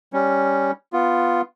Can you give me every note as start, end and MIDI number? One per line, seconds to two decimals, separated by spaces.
0.13 0.71 55
0.13 0.71 61
0.93 1.41 59
0.93 1.41 65